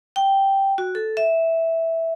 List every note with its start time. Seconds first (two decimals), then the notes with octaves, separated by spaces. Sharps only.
0.16 G5
0.78 F#4
0.95 A4
1.17 E5